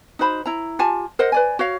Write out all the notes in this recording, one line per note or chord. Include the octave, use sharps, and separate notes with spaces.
D#4 F#4 C5 B5
E4 A#5
F4 G4 G#5 A5
A#4 C5 D#5 F#5
B4 D5 G#5
F#4 C#5 F5